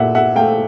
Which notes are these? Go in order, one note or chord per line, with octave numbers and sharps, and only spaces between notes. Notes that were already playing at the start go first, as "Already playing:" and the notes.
Already playing: A#2 A3 E5 F#5
E5 F#5
A3 F5 G5